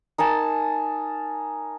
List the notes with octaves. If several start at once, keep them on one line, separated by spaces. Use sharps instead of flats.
D#4 A#4 G#5 A5